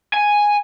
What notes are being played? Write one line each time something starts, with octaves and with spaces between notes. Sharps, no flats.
G#5